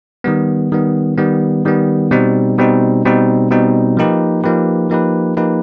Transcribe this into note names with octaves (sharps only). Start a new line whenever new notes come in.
D#3 G3 B3
D#3 G3 B3
D#3 G3 B3
D#3 G3 B3
B2 G3 C4 D#4
B2 G3 C4 D#4
B2 G3 C4 D#4
B2 G3 C4 D#4
F3 A#3 D#4 G4 B4
F3 A#3 D#4 G4 B4
F3 A#3 D#4 G4 B4
F3 A#3 D#4 G4 B4